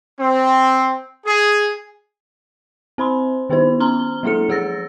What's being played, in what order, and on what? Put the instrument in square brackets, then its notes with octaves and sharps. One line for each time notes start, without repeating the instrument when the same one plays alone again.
[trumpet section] C4
G#4
[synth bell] C4 C5 B5 C6
D#3 B3 D#4 E4 C5
C#4 A#5 C6 F6 G7
F#3 G#3 A#3 E4 A4 C#7
F3 G#4 F#5 E6 A6 A#6